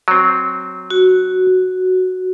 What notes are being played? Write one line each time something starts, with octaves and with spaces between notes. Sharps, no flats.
F#3 C4
F#4